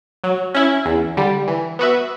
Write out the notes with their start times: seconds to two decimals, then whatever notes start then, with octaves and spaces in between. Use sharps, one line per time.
0.24 F#3
0.55 C#4 E4
0.86 E2
1.17 D3 G3
1.48 E3
1.79 B3 F#4 B4 E5